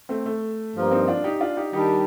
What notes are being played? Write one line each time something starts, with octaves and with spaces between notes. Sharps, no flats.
A3 C4
A3
G2 F3 A#3
C4 D#4
D4 F4
D#4 G4
D4 F4
D#4 G4
D#3 G3 D4 D#4 G4